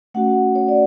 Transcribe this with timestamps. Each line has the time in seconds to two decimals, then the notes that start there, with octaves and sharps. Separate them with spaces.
0.14 A3 C#4 F#4 F#5
0.55 C#5
0.69 D5